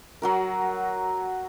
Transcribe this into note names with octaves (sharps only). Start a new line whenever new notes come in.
F#3 F#4 A#4